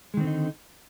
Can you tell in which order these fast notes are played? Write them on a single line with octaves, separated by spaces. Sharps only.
G#3 D#3 C4 D3 D#4